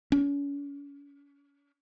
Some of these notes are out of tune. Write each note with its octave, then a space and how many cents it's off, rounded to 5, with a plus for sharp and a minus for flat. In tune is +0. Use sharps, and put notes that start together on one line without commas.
C#4 +35